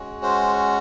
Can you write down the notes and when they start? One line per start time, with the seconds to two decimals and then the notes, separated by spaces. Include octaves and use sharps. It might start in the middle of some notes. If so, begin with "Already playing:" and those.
Already playing: G#3 C#4 F#4
0.23 C5